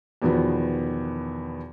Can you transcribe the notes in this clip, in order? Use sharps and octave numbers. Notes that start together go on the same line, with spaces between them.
E2 B2 D#3 F3 B3